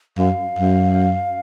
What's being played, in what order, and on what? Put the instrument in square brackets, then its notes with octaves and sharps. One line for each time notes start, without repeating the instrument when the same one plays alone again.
[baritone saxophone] F#2 [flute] F5
[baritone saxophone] F#2